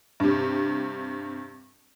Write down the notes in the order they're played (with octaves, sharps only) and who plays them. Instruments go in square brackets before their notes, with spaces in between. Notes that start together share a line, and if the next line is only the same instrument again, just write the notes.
[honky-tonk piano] G2 C3